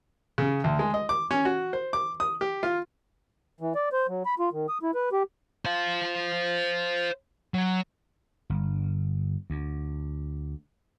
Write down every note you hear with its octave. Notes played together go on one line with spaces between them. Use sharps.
C#3
D2
G#3
D#5
D6
C#4
F#4
C5
D6
D#6
G4
F4
E3
D5
C5
F#3
B5
F4
D#3
D#6
E4
B4
G4
C5 F5
F#3
G1
D2